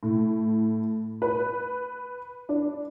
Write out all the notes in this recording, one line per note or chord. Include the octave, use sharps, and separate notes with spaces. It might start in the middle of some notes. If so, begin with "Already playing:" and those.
A2
B4
D4